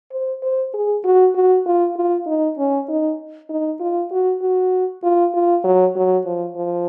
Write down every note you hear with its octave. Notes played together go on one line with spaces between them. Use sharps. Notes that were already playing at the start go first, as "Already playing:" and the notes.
C5
C5
G#4
F#4
F#4
F4
F4
D#4
C#4
D#4
D#4
F4
F#4
F#4
F4
F4
F#3
F#3
F3
F3